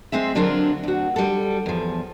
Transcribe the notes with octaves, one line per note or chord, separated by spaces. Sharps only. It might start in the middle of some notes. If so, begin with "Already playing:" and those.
G#3 C4 G#4 E5
D3 F#3 C4 D4 F4 A#4
D2 F#4
G3 A4
E2 F3